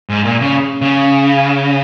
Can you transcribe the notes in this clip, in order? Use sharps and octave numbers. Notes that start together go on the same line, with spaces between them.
G#2
A#2
C#3
C#3